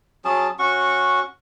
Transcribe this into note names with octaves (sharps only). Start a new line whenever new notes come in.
F#3 C#4 G#4 A5
C#4 F#4 C#6